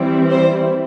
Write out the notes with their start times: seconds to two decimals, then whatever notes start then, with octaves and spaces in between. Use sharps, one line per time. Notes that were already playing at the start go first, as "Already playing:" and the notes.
Already playing: E3 G3 C4 E4
0.30 C5